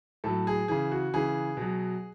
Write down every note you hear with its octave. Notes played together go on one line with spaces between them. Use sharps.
A2 F#3 A4
G#4
C#3 E3 G#4
F#4
C#3 E3 G#4
B2 F#3